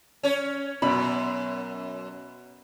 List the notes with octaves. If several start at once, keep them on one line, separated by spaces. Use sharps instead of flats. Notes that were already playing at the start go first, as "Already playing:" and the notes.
C#4 C#5
F#2 B2 B5